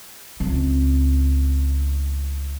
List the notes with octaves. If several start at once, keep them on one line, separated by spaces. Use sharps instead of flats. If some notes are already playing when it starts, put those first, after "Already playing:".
C#2 C4